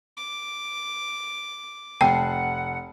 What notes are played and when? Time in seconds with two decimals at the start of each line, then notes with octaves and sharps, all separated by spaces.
0.17 D6
2.01 F1 F#5 G5 A5 C7